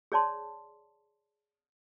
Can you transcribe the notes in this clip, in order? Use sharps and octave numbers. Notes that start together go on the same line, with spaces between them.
G#4 C#5 D5 A5 C6